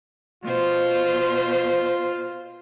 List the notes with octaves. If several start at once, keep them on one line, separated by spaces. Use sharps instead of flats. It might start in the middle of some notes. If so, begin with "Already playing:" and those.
B2 F4 C5